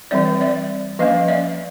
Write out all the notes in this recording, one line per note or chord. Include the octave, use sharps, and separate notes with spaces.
E3 G3 C4 D5 E5
D5 E5
F3 A#3 C#4 D#5 F5
D5 E5